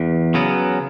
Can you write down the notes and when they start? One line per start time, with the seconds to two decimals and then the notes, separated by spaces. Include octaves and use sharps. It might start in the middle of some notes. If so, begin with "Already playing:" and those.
Already playing: E2
0.34 C#3 F#3 B3